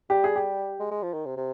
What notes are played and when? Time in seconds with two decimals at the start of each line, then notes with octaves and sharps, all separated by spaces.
0.10 G3 G4
0.24 G#4
0.36 G4
0.80 G#3
0.91 G#3
1.03 F3
1.14 D#3
1.26 C3
1.37 C3